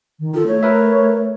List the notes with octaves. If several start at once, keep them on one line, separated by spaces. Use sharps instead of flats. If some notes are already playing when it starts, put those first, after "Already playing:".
D#3
F4 A4
A3 C#5
A#4 B4 E5